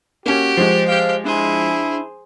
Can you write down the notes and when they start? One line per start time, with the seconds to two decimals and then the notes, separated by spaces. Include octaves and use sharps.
0.26 A#3 C#4 F#4 G4
0.57 F3 G#3 C5
0.87 G4 F5 G5
1.25 D4 E4 G#4 C5 G#5 C6